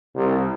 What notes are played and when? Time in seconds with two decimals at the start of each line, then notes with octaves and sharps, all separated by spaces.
0.16 C2